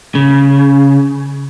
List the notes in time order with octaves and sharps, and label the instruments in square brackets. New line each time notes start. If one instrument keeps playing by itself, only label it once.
[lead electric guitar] C#3